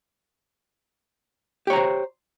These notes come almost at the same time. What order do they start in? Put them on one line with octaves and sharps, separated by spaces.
G4 C#5 A#5 C5